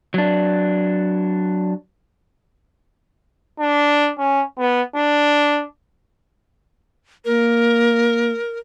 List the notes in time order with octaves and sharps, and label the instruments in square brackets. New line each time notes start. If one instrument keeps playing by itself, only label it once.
[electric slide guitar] F#3 D4
[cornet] D4
C#4
B3
D4
[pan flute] A#3 [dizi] A#4